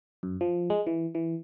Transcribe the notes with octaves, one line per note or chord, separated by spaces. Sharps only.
F#2
F3
G#3
E3
E3